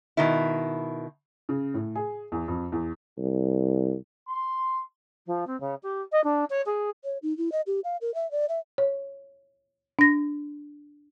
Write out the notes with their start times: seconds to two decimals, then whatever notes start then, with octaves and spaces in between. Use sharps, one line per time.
0.17 B2 D#3 E4
1.49 C#3
1.74 A2
1.95 G#4
2.32 E2
2.48 F2
2.72 E2
3.18 C2
4.29 C6
5.26 F3
5.47 C4
5.60 C#3
5.82 G4
6.12 D#5
6.24 D4
6.50 C#5
6.65 G#4
7.05 C#5
7.23 D#4
7.38 E4
7.52 D#5
7.67 G4
7.84 F5
8.01 A#4
8.15 E5
8.31 D5
8.49 E5
8.78 C#5
9.99 D4 A#6